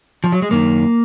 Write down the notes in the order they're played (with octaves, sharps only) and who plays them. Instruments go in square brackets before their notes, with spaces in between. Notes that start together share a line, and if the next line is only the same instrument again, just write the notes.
[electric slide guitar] F3
F#3
G#3
F#2 D#3 A#3